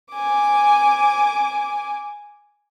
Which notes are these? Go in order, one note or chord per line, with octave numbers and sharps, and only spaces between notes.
G#5 D6